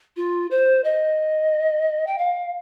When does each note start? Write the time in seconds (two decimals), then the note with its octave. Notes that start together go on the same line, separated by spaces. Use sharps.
0.17 F4
0.51 C5
0.84 D#5
2.07 G5
2.18 F5